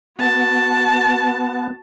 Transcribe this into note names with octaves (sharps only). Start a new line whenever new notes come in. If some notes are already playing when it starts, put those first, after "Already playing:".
B3 F#4 A5